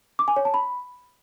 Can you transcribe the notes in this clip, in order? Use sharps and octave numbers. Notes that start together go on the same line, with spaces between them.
D6
G#5
C#5
A5
B5